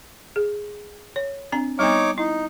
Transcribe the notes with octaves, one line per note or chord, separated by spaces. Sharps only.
G#4
C#5
C4 D4 A#5
G3 B3 D#4 C#5 D6
D#4 E4